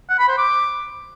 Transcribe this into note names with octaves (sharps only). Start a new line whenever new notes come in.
F#5
B5
C5
D6